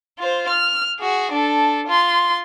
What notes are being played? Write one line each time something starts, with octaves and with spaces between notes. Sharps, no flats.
F4 C5
F6
F#4 G#4
D4 A4
F4 C6